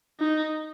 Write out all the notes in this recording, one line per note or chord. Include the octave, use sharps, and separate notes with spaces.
D#4